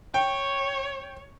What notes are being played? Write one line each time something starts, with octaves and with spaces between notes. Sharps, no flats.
C#5 G5